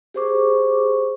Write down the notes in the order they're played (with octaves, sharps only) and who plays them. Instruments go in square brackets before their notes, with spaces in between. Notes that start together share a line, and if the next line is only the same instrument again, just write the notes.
[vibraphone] G4 G#4 C5 C#6 D6